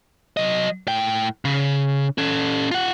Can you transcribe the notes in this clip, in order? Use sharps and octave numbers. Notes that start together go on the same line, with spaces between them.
F#3 D#5
A2 G5
C#3
C#4 A4
F4 F#5